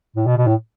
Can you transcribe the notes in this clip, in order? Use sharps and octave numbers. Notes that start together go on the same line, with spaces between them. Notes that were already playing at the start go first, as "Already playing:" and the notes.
A2
B2
B2
A2